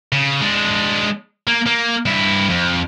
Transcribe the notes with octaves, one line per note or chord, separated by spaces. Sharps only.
C#3
G#3 D4
A#3
A#3
G2 E4
F2